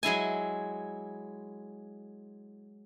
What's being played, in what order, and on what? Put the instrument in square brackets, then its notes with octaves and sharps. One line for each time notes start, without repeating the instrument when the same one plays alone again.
[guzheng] F#3 G#3 E4 G#5